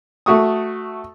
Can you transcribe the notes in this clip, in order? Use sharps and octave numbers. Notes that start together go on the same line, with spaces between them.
A3 F#4 C#6 D#6